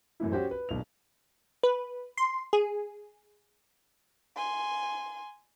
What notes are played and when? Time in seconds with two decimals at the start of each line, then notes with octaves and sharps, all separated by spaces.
0.20 F#2 A2 E3 E4
0.32 C#4 F#4 G4 C5
0.51 B4
0.69 D#1 B1 F7
1.63 B4
2.17 C6
2.53 G#4
4.37 G#5 C6